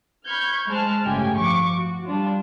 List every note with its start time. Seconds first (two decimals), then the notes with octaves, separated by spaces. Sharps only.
0.27 B5 C#6 F6 G6 G#6
0.67 G#3 C5 A5 F6 F#6
1.04 G1 A2 C#3 G4 G5 G#5
1.36 F3 C#6 D6
1.76 F#4
2.06 G3 D4 F4